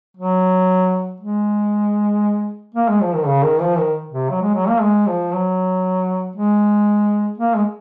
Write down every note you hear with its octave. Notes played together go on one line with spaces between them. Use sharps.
F#3
G#3
A#3
G#3
F3
D#3
C#3
D#3
F3
D#3
C3
F#3
G#3
F#3
A#3
G#3
F3
F#3
G#3
A#3
G#3